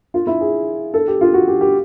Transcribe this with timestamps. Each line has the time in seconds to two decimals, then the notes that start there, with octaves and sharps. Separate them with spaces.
0.14 F4
0.27 E4
0.41 G#4
0.94 A4
1.08 G4
1.21 F4
1.34 F#4
1.48 G4
1.61 G4